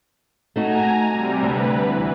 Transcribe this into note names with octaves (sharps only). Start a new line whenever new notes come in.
A3 D#4 F#4 G#5 A#5
C3 G3
D2 B4
E3